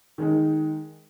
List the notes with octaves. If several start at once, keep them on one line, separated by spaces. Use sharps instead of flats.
D#3 G#3 D#4